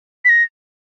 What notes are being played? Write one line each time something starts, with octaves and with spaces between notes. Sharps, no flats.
B6
A#6